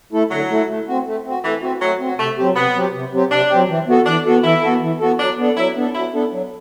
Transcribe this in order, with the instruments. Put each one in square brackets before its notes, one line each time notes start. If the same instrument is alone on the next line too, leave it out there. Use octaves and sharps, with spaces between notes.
[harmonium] A3 E4 A4
[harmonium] D3 [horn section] F#3
[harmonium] A3 E4 A4
A3
C4 F#4
A3
C4 F#4
[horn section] E3 [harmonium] A3
[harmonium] C4 F#4
[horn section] F#3 [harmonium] A3
[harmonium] C4 F#4
[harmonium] C3 [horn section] A3
[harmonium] F#3 C4 G4
[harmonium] C3 [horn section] B3
[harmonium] F#3 C4 G4
C3
F#3 C4 G4
[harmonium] C3 [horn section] D4
[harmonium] F#3 C4 G4
E3
B3 F#4 A4
[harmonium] E3 [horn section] D4
[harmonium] B3 F#4 A4
[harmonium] E3 [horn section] E4
[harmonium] B3 F#4 A4
E3
B3 F#4 A4
[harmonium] F#3 [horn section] D4
[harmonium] B3 D4 A4
[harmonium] F#3 [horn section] E4
[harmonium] B3 D4 A4
[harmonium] F#3 [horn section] E4
[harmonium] B3 D4 A4
F#3